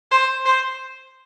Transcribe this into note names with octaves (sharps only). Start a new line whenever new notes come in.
C5
C5